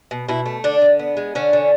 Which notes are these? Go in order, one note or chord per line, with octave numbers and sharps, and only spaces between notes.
B2
B2 E4
A3
D3 D4
D3
B3
G#3
D3 C#4
D3